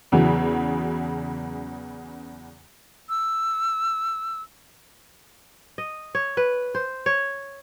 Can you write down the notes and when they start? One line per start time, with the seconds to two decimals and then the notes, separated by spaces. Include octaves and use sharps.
0.12 E2 C#3 E3 F#3
3.09 E6
5.78 D#5
6.15 C#5
6.37 B4
6.75 C5
7.06 C#5